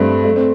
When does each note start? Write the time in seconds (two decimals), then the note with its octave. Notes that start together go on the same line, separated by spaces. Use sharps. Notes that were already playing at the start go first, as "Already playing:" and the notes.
Already playing: G2 A3 C4
0.25 A3
0.36 C4